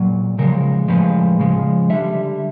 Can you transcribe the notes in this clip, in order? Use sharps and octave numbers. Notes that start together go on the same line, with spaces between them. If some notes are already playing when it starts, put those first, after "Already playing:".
Already playing: A#2 F#3
C#3 F3 G#3 A#4
A2 F3 G#3 B4
C#3 F3 G#3
D3 G3 E5